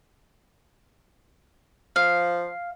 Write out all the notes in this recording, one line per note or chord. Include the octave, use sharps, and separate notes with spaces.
F3 F5